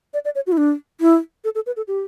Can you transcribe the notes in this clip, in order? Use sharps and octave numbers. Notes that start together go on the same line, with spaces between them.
D5
D5
C#5
F#4
E4
D4
E4
A4
A4
B4
A4
G4